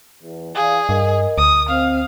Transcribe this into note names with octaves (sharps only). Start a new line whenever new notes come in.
E2
E3 G#4 D5 F5
G2 A#4 D#5
D2 D#6
C4 F5